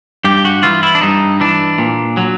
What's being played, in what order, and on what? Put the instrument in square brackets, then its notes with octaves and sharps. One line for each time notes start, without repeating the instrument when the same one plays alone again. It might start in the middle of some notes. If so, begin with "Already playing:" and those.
[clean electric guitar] G2 G4
F#4
E3 F4
E4
D4
G2 D#4
E3 D4
A#2
F#3